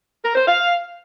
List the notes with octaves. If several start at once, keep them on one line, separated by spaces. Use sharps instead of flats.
A#4
C5
F5